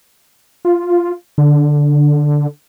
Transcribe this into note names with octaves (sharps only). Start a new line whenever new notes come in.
F4
D3